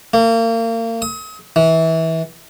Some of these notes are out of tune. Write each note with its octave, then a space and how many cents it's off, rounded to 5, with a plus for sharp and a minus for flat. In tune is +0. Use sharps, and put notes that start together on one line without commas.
A#3 -35
D#6 +40
E3 -25